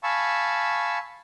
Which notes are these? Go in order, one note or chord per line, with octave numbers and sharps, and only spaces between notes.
F5 G#5 A5 B5 C#6 E6